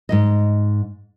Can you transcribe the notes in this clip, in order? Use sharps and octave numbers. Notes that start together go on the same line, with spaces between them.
G#2 B2 D#5